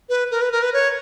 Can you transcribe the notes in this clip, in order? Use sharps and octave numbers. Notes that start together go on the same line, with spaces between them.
B4
A#4
B4
A#4
B4
C#5